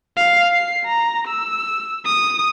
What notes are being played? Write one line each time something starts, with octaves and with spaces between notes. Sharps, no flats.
F5
C7
A#5
E6
D#6